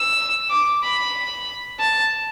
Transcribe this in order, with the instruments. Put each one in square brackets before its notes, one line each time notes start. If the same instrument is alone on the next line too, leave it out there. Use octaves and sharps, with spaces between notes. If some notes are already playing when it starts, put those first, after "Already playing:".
Already playing: [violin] E6
D6
B5
A5